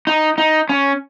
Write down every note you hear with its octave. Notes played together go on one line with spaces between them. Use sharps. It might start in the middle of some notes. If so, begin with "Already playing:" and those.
D#4
D#4
C#4